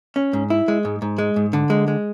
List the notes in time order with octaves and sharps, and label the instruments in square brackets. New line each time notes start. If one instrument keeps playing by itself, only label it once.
[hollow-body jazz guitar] C#4
G#2
E4
G#3
G#2
G#2
G#3
G#2
D3
G#3
G#3